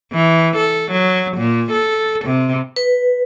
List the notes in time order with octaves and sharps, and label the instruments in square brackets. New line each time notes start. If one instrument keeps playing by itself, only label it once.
[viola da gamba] E3
A4
F#3
A#2
A4
C3
[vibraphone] B4